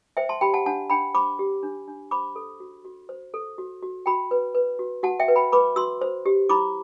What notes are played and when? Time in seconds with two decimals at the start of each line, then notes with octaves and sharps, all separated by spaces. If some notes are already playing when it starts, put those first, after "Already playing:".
0.17 C5 E5 G5
0.29 A5 C6
0.41 G4 G5 B5
0.54 F#5 A5
0.66 D4 F#5 A5
0.90 D4 G5 B5
1.14 C5 B5 D6
1.39 G4
1.63 D4
1.88 D4
2.11 C5 B5 D6
2.36 A4
2.60 F#4
2.85 F#4
3.09 C5
3.34 A4
3.58 F#4
3.83 F#4
4.06 F#4 G5 B5
4.31 B4
4.54 B4
4.79 F#4
5.03 F#4 F#5 A5
5.20 E5 G5
5.28 B4
5.36 G5 B5
5.52 B4 B5 D6
5.76 F#4 C6 E6
6.01 C5
6.26 G4
6.49 E4 B5 D6